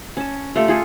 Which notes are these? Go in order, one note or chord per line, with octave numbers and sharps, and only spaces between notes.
C#4 A5
A3 F4 G4 A4
F4 G#4 A4